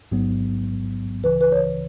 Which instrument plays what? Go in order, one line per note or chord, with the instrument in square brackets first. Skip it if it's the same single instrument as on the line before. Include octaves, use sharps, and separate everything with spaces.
[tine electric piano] A1 G#2 F#3 B3
[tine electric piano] C#2 C#3 E3 [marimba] B4
[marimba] B4
C#5